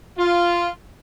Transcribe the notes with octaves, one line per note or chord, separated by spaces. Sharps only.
F4